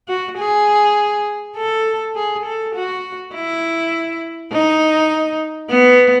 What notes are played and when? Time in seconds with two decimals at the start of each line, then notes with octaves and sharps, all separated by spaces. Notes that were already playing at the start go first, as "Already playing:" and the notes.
0.08 F#4
0.38 G#4
1.57 A4
2.16 G#4
2.46 A4
2.75 F#4
3.34 E4
4.52 D#4
5.70 B3